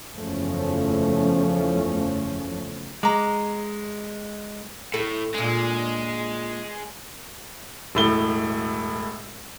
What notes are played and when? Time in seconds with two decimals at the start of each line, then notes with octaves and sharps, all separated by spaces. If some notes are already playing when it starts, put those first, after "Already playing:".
0.14 F#1 E2 F3 A3 C#4
3.03 G#3 A#5 D6
4.94 A2 A4
5.35 A#2 G#3 D4
7.95 E1 A2 G7